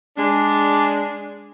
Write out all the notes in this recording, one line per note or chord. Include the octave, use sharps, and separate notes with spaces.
G#3 D4